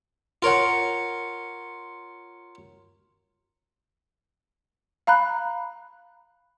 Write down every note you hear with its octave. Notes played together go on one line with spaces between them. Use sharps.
F4 A#4 C#5 F#5
F5 A#5 B5 F#6